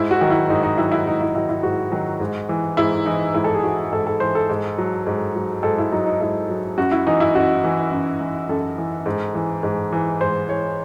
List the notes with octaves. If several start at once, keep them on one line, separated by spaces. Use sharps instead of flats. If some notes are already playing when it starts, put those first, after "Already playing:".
Already playing: G#2 E4
F#4
D#3 F#3
E4
G#2 D#4
D#4
D#3 F#3 E4
E4
G#2 D#4
E4
D#3 F#3 E4
E4
G#2 F#4
D#3 F#3
G#2
E3
G#2 E4
E3 D#4
G#2 E4
A4
G#4
E3 F#4
G#2 A4
A4
E3 C5
A4
G#2
F#3
G#2
F#3
G#2 A4
E4
F#3 D#4
D#4
G#2 E4
F#3
F#2 F#4
E4
E3 D#4
E4
F#2 F#4
E3
F#2
E3
F#2 A4
E3
G#2
E3
G#2
E3
G#2 C5
E3 C#5